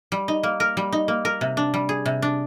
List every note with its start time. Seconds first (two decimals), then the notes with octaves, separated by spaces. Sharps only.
0.12 G3
0.28 D#4
0.43 A#3
0.60 A#4
0.77 G3
0.92 D#4
1.08 A#3
1.25 A#4
1.41 C3
1.57 D4
1.74 G3
1.89 G#4
2.06 C3
2.22 D4